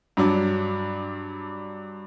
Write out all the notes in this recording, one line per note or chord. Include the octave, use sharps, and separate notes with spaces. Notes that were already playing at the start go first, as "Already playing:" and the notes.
G2 F#3 D4